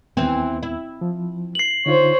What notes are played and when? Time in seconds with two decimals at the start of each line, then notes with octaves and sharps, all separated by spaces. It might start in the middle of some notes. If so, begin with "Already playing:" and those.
0.17 D#2 E3 B3 C4
0.63 E4
1.01 F3
1.55 C7 F#7
1.86 D3 D#4 F4 C5 C#5